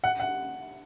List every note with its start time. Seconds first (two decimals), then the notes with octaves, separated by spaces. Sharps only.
0.04 F#5
0.20 F#5